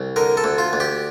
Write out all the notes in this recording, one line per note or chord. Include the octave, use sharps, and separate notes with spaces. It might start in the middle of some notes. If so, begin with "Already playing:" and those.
Already playing: C2
D3 A#4
A4
D2
F4
D2
G4